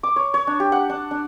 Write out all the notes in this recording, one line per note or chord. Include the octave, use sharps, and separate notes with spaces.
D6
C#5
C#5
D4
G4
F#5
D4
D4